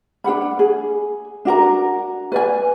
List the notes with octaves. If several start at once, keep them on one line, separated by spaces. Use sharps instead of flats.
D4 A4 F#5 B5
G#4
D4 F#4 A#4 A#5
B4 D5 G#5